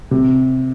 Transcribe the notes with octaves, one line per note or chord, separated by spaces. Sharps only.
C3